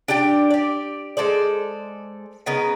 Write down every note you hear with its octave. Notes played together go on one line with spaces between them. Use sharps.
D4 G4 D5 G5
G4 D5
G#3 A4 C5 D5
C#3 B3 D#4 A#4